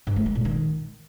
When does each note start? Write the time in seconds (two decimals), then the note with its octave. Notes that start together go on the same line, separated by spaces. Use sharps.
0.07 G2
0.16 A3
0.26 G#3
0.35 A#2
0.45 D#3